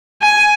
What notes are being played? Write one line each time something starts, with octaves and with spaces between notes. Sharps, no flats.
G#5